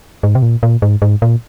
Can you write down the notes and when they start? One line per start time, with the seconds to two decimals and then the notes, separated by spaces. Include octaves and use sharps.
0.23 G#2
0.35 C3
0.42 A#2
0.63 A#2
0.82 G#2
1.02 G#2
1.22 A#2